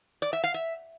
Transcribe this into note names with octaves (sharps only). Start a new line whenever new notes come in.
D5
E5
F5
E5